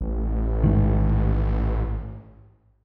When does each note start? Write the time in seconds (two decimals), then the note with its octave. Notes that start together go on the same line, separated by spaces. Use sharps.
0.01 A1
0.63 G#2 D#3